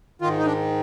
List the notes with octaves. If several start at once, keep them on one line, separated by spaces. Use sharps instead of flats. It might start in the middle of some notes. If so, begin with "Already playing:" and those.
G#2 D#3 F4
D#4
D4